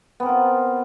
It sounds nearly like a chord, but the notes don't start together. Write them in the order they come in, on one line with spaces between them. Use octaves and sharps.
B3 C4 A#4 F4